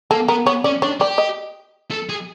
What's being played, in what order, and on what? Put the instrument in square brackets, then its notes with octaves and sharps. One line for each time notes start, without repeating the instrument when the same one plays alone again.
[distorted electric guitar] A#3 [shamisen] A4
[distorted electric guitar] B3 [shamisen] A#4
[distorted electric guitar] B3 [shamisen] C#5
[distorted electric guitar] C#4 [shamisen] D5
[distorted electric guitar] D4 [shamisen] C#5
[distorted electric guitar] G4 [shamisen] D5
[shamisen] D#5
[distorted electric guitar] A4
G#4